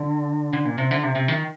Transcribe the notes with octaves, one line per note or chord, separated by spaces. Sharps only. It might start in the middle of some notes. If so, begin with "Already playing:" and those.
Already playing: D3
D3
A#2
C3
D3
C3
C3
D#3